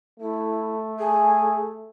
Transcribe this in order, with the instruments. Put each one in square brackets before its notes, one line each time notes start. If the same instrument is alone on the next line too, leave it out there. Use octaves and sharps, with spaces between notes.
[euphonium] A3 [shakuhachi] E4
[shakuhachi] G#4